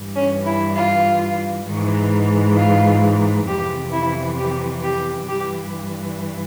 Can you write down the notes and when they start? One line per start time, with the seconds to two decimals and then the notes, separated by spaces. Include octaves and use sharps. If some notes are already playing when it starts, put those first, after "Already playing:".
Already playing: G2 E3
0.14 C#4
0.45 E4
0.75 F4
1.65 G#2 E3
2.55 F4
3.46 F2 C3 E3 G4
3.91 E4
4.37 G4
4.82 G4
5.27 G2 E3 G4